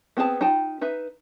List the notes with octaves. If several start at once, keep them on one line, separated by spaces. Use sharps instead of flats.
B3 C4 G#4 C5 A5
D#4 F4 G5 A5
D#4 B4 E5